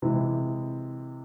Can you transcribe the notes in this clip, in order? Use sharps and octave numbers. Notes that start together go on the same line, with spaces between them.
C3 E3 G#3 C4 E4